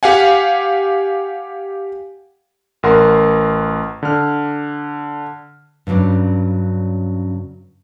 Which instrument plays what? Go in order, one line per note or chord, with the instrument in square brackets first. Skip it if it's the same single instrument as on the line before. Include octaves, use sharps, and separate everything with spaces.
[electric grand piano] G4 F5 F#5 G#5
A1 A#4 F#5 C6
D3 F6
[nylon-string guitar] G2 C#3 F#3 C#4 D4